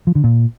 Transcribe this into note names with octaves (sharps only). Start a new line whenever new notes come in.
F3
D3
A#2